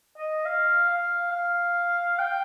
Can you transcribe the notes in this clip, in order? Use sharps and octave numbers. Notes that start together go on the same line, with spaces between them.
D#5
F5
F5
F5
G5